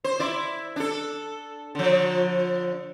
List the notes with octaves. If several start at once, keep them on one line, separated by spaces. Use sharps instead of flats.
C5
E4 D5
D4 A4
D3 F3